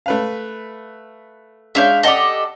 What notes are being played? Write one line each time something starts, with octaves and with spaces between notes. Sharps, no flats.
A3 B4 F5
G#3 D4 C#5 E5 F5 G6
G4 A4 D5 D#5 F#5 A5